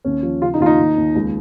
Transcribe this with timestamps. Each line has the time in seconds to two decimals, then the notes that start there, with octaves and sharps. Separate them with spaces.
0.05 D#2 C#4
0.23 F3
0.42 C#3 F4
0.54 D#4
0.60 D#2 F4
0.66 D#4
0.79 D#2
0.97 D#2
1.15 C#2